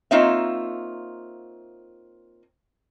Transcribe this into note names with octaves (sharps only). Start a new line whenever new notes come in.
A#3 C4 D#4 F4 C#5 E5